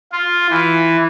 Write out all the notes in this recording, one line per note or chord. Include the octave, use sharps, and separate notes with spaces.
F4
E3